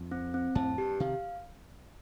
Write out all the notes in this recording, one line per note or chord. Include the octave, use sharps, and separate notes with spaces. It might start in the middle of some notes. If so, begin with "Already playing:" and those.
Already playing: F2
C4
C4
F2 A2 A5
G2 G4
C3 D#3 F5